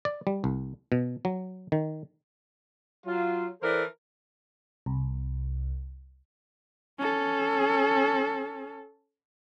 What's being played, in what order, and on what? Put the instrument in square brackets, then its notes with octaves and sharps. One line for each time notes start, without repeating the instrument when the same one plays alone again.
[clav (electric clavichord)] D5
G3
C2
B2
F#3
D#3
[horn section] F#3 F4
E3 A4 A#4 C5 D5
[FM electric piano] C2
[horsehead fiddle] C#4 A4